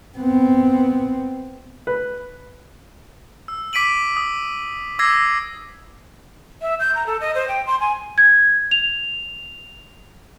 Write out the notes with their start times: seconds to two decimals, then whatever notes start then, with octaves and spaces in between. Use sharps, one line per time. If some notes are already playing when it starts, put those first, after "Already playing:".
0.17 B3 C4
1.87 B4
3.48 E6
3.73 D6 B6 D7 D#7 F#7
4.17 D#6
4.99 D6 E6 G#6 A#6 C7
6.62 E5
6.80 G6
6.95 A#5
7.06 A4
7.21 D#5
7.35 C5
7.48 G5
7.67 C6
7.80 G#5
8.18 G#6
8.71 F7